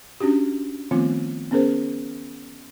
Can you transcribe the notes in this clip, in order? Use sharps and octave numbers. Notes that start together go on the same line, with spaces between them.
C#4 D4 F#4 G4
D#3 F3 A3 B3 C4 F4
B3 C#4 G#4 A#4 C5